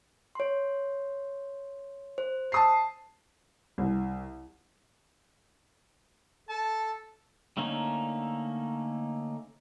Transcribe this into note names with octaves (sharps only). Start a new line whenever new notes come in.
C#5 C6
C5
A5 D#6 C7
C2
A4 A5
D3 A3 A#3 C#4 D#4